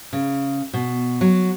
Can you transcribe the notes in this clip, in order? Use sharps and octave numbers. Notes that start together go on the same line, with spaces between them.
C#3
B2
F#3